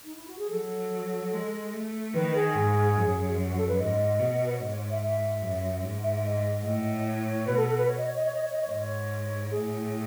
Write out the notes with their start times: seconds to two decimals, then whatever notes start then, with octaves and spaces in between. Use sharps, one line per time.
0.03 D#4
0.15 E4
0.27 F#4
0.38 G#4
0.49 F#3 A4
1.32 G#3
1.73 A3
2.14 D#3 B4
2.34 G#4
2.54 G#2
2.96 F#2
3.47 F#4
3.58 A4
3.67 B4
3.78 G#2 D#5
4.19 B2
4.45 B4
4.52 C#5
4.60 G#2 D#5
4.69 C#5
4.80 C#5
4.90 E5
5.01 E5
5.42 F#2
5.83 G#2
6.03 E5
6.15 E5
6.24 D#5
6.64 A2
7.06 C#5
7.26 C#5
7.46 B2 B4
7.56 A4
7.67 A4
7.77 B4
7.87 C#5
7.97 D#5
8.06 C#5
8.16 D#5
8.25 C#5
8.34 D#5
8.42 C#5
8.52 D#5
8.61 C#5
8.69 G#2 D#5
8.79 C#5
9.51 A2 G#4